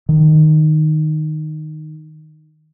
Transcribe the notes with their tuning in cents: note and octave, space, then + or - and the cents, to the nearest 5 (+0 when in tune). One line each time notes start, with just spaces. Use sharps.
D#3 -10